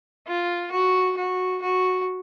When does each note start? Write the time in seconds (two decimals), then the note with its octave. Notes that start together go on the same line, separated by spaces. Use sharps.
0.27 F4
0.71 F#4
1.17 F#4
1.62 F#4